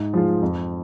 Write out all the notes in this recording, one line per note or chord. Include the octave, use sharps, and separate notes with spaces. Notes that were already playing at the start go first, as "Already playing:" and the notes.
Already playing: G#2
F3 G#3 F4
F2